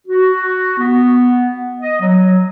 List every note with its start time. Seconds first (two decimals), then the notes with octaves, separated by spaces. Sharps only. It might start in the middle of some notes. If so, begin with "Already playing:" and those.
0.07 F#4
0.78 B3
1.80 D#5
2.01 F#3